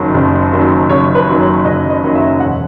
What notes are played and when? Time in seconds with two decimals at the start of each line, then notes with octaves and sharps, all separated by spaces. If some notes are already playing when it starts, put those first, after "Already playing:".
Already playing: F#1 F#2 D#3 F#3
0.14 F#1
0.52 F#2 D#3 F#3
0.89 F#1 C#5
1.15 B4
1.27 F#2 D#3 F#3
1.40 C#5
1.65 F#1 D#5
1.90 D#5
2.03 F#2 D#3 F#3
2.15 E5
2.40 E1 F#5